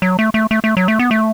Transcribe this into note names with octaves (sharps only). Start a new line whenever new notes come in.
F#3
A3
A3
A3
A3
F#3
A3
B3
A3